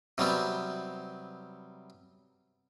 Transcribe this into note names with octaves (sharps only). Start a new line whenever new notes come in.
C3 F#3 G3 B3